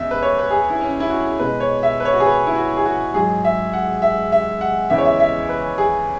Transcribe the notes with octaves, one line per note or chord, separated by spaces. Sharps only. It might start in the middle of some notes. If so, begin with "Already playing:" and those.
Already playing: E2 C#3 G#3 E5
B4
C#5
B4
G#4
E4
C#4
E4
F#4
B2 G#3 B4
C#5
E5
B4
C#5
F#4
G#4
B4
E4
F#4
G#4
F#4
G#2 F#3 G#4
E5
F#5
E5
E5
F#5
E2 C#3 E3 G#3 E5
C#5
E5
E5
B4
G#4